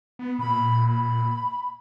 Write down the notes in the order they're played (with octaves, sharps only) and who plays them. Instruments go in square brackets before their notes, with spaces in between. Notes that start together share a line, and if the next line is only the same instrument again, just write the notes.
[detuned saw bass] B3
[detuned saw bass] A#2 [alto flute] B5
[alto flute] B5